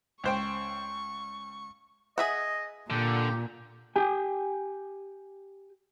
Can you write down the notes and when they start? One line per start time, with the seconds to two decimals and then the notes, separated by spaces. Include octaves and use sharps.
0.24 C#2 C5 G5 C#6
2.18 G#4 D#5 E5 F#5
2.90 A#2 D3 G4
3.96 G4 G5 G#5